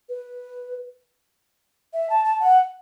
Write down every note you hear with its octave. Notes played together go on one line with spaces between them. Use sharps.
B4
E5
A5
A5
F#5